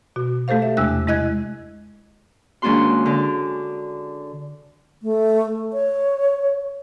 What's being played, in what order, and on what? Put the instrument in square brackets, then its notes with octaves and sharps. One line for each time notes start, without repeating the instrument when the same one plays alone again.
[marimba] B2 F#4
A3 G4 A4 C5 F5
E5
E2 C3 G#3 D4 E6 F#6
G#3 E4 D#5 F#6 G#6
[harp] D#2 G#2 C#4 D4 F#4 C6
D3
[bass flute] A3
C#5